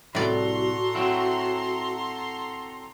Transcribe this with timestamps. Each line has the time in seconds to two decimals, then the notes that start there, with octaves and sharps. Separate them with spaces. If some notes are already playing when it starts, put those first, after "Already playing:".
0.15 C2 A2 F#4 A4 D5 A#5 C6
0.95 F#3 C4 E4